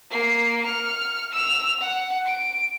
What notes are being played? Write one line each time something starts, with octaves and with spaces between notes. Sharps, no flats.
A#3 C7
F6 C#7
E6 F7
F#5
D7